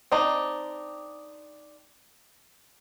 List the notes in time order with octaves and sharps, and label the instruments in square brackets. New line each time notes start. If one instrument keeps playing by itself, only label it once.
[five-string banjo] C4 D4 D#4